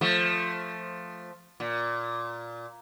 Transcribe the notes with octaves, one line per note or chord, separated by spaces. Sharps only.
F3 A3
A#2